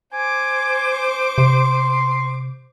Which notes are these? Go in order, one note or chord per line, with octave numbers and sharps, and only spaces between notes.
C5 G#5 D6
C3 C6